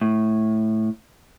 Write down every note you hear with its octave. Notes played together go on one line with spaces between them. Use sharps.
A2